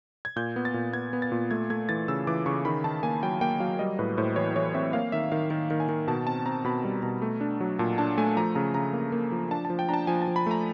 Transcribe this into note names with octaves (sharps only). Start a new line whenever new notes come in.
G#6
A#2 G6
B3
A6
A#2
B3 G#6
B3
A6
A#2
A3 G#6
A3 G#6
E3 A6
C#3 E6
E3 D6
C#3 C#6
D#3 B5
D#3 A5
A#3 G#5
F#3 G5
A#3 G5
F#3 F5
G3 D#5
A2 B4
A2 C5
E3 C#5
E3 C#5
C4 E5
A#3 F5
D#3 E5
D#3 F5
D#3
D#3
G#5
D#3
B2 A5
C4 A5
C4 A#5
B2 B5
G3
B2 A#5
A3
D4
F#3
A#2 A5
D4 A5
A3 G#5
F3 A#5
C#3 A#5
C#3 A#5
A#3
A#3
F3
D4 A5
F3 A5
G5
D4 A5 A#5
F3 G#5
A5
F3
B5
A3 A#5